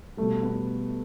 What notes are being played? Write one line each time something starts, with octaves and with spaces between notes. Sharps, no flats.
B2 G3 A3
B3